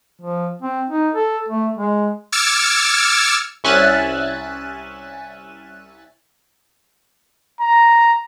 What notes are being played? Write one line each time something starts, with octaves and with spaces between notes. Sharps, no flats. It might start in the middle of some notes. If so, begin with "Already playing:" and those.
F3
C4
D#4
A4
A3
G#3
D6 E6 F6 G#6 A6 C#7
C2 C#4 E5 G#5 F#6 A6
A#5